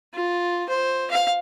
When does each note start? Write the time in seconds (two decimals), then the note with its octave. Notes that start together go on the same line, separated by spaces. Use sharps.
0.14 F4
0.69 C5
1.11 F5